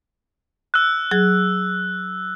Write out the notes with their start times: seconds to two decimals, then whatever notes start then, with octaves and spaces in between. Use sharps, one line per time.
0.74 E6 F#6
1.11 F#3 G#4